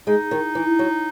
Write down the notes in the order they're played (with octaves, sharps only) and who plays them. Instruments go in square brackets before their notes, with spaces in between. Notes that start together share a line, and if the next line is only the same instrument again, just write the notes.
[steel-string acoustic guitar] G#3 [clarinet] D#4
[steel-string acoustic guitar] D#3
E3
F#3